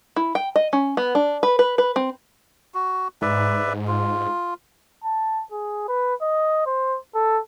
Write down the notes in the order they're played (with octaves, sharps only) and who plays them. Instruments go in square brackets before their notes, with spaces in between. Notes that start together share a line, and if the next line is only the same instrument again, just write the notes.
[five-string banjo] E4
G5
D#5
C#4
B3
D4
B4
B4
B4
C4
[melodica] F#4
[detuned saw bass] G#2 [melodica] B4 D5 E5
[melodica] F4
[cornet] A5
G#4
B4
D#5
C5
A4